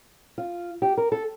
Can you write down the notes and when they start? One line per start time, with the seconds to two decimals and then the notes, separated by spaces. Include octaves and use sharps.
0.38 F4
0.82 G4
0.97 A#4
1.12 A4